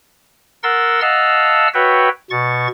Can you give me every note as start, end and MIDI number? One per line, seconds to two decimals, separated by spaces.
0.63 1.01 70
0.63 1.01 78
0.63 1.01 84
0.63 1.01 88
0.63 1.01 93
1.01 1.68 75
1.01 1.68 77
1.01 1.68 78
1.01 1.68 81
1.01 1.68 88
1.01 1.68 89
1.74 2.09 66
1.74 2.09 71
1.74 2.09 73
1.74 2.09 76
1.74 2.09 79
2.31 2.68 47
2.31 2.68 85
2.31 2.68 93